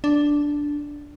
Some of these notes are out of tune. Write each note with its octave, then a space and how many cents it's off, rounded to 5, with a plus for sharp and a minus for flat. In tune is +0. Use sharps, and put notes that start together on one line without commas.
D4 -5